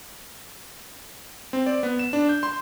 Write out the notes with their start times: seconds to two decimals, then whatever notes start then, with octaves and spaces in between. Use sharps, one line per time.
1.53 C4
1.66 D5
1.83 B3
1.99 E7
2.13 D4
2.29 G6
2.43 C6